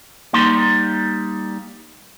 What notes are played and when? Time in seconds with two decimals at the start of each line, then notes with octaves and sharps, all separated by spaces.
0.33 G3 A#3 D#4 C6